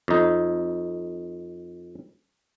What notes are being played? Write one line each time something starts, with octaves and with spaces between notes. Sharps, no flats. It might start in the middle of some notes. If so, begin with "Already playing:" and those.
F2 D#4